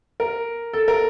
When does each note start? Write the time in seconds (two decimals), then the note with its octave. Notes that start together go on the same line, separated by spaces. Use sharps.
0.20 A#4
0.73 A4
0.88 A#4